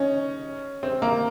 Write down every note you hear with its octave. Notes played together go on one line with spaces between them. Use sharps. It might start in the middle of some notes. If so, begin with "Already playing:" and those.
Already playing: C#4 D#4
C4
A#3